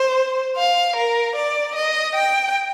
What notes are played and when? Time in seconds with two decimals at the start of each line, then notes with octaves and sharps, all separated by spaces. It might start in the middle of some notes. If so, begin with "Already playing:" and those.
Already playing: C5
0.57 F5
0.96 A#4
1.36 D5
1.76 D#5
2.16 G5